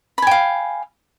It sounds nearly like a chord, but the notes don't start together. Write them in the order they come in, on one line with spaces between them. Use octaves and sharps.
B5 G#5 G5 F5